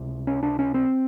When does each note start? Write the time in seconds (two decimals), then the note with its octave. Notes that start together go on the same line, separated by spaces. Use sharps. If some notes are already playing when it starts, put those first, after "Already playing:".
Already playing: C#2 C3
0.27 C#4
0.43 D4
0.59 C#4
0.74 C4